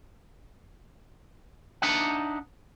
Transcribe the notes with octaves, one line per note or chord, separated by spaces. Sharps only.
D4 D#4 E5 F#5